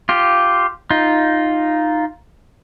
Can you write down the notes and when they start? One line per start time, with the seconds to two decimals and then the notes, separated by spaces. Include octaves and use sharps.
0.09 F4 G4
0.90 D#4 F4